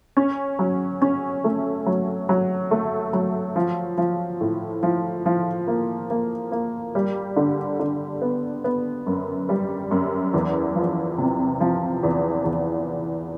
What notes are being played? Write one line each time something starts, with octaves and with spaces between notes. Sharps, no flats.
C#4
F#3
C#4
A3
F#3
F#3
A3
F#3
F3
F3
A2
F3
F3
A#3
A#3
A#3
G3
D3
D3
B3
B3
F#2
G3
F#2
E2
F3
C3
F3
E2
E2